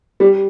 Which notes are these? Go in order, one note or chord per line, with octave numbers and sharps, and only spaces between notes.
G3